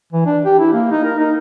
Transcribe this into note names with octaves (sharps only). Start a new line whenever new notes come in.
E3
D4
G4
E4
A#3
D#4
A#4
D#4